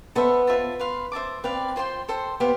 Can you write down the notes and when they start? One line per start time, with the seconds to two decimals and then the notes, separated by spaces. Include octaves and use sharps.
0.15 B3 A4 C5 E5 B5
0.47 F4 C5 E5 A5
0.79 B4 F5 C6
1.12 C5 E5 A5 D6
1.44 C4 B4 D5 F5
1.76 F4 C5 G5 C6
2.09 A4 C5 G5 C6
2.40 B3 G4 C5 F5